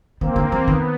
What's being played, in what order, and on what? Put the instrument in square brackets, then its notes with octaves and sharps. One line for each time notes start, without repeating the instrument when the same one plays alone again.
[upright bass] D#3 [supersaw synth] A#3 C4
[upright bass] D3
E3
[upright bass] D#3 [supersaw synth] B3